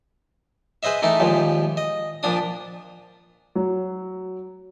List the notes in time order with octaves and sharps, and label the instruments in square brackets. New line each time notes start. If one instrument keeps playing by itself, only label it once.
[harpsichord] G#4 B4 C5 D#5 E5
E3 A3 D#4 E4
D#2 A#2 F3 G#3
D#5
A#2 F3 D4 D#6
[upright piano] F#3